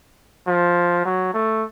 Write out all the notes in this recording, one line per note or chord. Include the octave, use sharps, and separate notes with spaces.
F3
F#3
A3